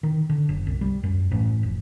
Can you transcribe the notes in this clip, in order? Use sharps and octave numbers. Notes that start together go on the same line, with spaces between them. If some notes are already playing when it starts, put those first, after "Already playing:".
D#3
D3
F#1
C2
G3
F#2
A1
F1